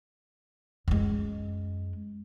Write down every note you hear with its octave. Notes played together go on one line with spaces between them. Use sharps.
F#2 G#3